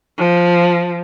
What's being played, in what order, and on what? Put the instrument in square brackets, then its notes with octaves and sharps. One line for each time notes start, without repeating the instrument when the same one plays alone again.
[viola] F3